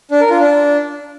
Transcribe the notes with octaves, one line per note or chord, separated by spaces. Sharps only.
D4
A#4
F4
D4